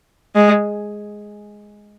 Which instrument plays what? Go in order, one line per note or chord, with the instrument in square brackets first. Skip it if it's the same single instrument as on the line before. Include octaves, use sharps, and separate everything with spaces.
[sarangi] G#3